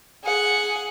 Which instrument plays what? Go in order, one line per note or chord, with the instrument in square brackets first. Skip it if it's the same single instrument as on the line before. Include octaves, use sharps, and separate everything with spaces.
[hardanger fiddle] G#4 F#5